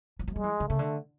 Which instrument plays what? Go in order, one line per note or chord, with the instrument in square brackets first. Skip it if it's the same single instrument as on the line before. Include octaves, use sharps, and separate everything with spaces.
[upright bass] F3
F#3
[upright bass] G3 [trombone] G#3
[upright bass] E3
D3
[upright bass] C#3 [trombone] A3
[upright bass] D3